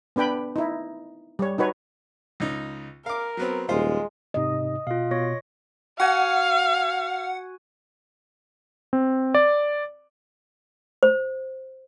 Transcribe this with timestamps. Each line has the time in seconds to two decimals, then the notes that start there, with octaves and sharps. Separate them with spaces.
0.16 B3 D4 B4 G5 B5
0.56 D#4 E4
1.39 G3 C#5
1.58 D#4 F#4 B4 C#5
2.40 C#2 D#4
3.06 A#4 F5 D6
3.37 F#3 B3 C4
3.69 D#1 G#3 F4 C5
4.34 G#2 C3 D#4 D#5
4.87 B2 F4 F5
5.11 B2 C#5 C#6 A#6
6.00 F#4 F5 F#5 G#5
8.93 C4
9.35 D5
11.03 C5